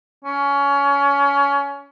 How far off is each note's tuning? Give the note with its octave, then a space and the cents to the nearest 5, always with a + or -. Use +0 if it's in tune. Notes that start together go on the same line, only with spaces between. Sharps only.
C#4 +25